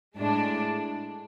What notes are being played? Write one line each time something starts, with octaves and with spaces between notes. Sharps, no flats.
A2 G#3 D4